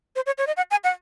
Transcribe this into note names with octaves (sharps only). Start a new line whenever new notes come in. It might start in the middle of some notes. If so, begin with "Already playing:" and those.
C5
C#5
C#5
D#5
F#5
G#5
F#5